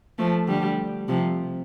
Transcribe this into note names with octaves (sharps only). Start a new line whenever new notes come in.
F3 A3
D3 G3
C3 F3